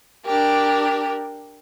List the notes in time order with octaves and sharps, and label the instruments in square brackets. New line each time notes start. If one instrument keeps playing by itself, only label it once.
[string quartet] D4 G4 A#4